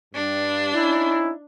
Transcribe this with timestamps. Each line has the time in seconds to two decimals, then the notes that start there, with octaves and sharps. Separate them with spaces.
0.14 G2 D4
0.74 C#4 D#4 E4